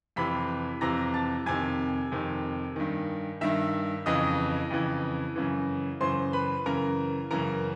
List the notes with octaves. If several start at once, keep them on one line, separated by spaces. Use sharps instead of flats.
F2 C3 E3 B5 B6
F2 C3 E3 A#5 A#6
A5 A6
F2 C3 D#3 G#5 G#6
F2 C3 D#3
G2 D#3
G2 D#3 E5 E6
F2 C#3 E3 D#5 D#6
F2 C#3 E3
F#2 C#3 E3
F#2 C#3 E3 C5 C6
B4 B5
F#2 C#3 E3 A#4 A#5
F#2 C#3 E3 A#4 A#5